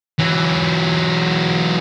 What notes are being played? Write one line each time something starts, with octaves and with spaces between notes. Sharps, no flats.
E3 F#3